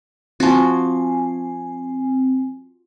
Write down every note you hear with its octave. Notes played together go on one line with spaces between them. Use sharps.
F3 C4 F#4 G#5